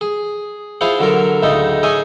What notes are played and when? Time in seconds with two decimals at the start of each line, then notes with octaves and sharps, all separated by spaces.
0.01 G#4
0.81 E4 F4 G#4 C5 F5 F#5
0.99 D3 F#3 A4 A#4
1.42 D2 A2 C#3 G#3 D#4 A4
1.83 D#4 G#4 C#5 E5 G#5